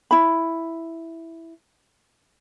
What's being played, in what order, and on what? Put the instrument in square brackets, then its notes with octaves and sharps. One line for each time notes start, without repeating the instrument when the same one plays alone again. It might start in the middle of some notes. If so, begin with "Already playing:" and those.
[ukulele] E4 B5